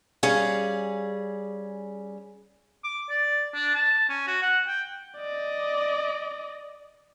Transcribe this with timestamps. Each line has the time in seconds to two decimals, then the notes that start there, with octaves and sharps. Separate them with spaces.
0.23 G3 C#4 G#4 F5
2.84 D6
3.09 D5
3.54 D4
3.75 A5
4.09 C#4
4.27 F#4
4.42 F#5
4.67 G5
5.18 D5 D#5